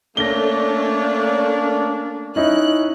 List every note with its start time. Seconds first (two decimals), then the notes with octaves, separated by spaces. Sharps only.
0.17 A3 A#3 C#4 D4 C#5 A#6 G7
2.36 C#4 D#4 E4 F#6